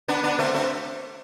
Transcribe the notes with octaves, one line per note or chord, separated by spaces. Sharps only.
B3 D4
B3 D4
A3 C4
A3 C4